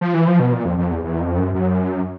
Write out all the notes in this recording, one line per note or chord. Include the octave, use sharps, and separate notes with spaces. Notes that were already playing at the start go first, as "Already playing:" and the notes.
F3
E3
F3
B2
A#2
F2
F2
E2
E2
F2
F#2
F#2